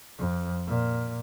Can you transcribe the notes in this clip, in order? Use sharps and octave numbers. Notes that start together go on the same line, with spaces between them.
F2
A#2